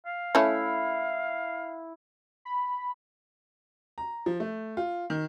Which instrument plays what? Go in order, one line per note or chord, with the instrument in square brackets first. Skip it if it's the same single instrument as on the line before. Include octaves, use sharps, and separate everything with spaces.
[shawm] F5
[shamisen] A3 C#4 [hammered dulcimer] E4
[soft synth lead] B5
[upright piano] A#5
F3
A3
F4
D#3